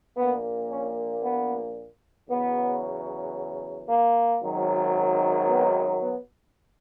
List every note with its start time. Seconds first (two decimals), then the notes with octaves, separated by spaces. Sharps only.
0.16 A#1 A#2 A#3 B3
0.70 C#4
1.23 B3
2.29 E2 C#3 F#3 B3
3.88 A#3
4.42 G#1 F#2 D#3 F#3
5.48 B3
6.01 B3